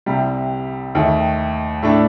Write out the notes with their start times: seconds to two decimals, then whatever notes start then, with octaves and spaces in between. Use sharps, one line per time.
0.06 C2 C3 G3
0.95 D#2 D#3 A3
1.82 A2 A3 D4